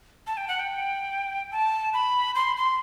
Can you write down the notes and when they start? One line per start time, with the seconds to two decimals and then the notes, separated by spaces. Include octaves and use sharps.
0.27 A5
0.37 G5
0.48 F#5
0.60 G5
1.52 A5
1.94 B5
2.35 C6
2.57 C6